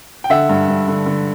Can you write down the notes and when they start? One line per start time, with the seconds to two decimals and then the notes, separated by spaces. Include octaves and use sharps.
0.24 G5
0.30 D3 E5 F#5
0.49 G2
0.68 G2
0.88 D3
1.06 D3